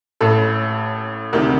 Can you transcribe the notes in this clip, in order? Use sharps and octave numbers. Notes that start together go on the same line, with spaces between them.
A1 A2 A4
D2 C3 D#3 A#4